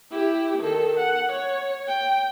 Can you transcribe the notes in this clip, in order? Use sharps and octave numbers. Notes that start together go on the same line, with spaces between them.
E4 G4
D#3 A4
F#5
C#5
G5